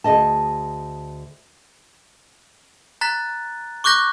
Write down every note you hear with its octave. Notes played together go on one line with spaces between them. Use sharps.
D2 G#4 D#5 A5
A#5 F#6 A6 B6
C#6 D6 F#6 G6 A#6